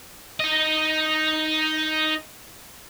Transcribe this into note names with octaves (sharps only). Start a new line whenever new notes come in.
D#4 D#5